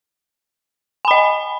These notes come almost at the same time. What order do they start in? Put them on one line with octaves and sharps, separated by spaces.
G#5 B5 D#5